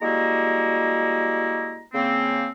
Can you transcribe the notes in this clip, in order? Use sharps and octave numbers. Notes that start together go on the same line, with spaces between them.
G3 G#3 A#3 E4 F#4 A#5
C#3 A#3 C4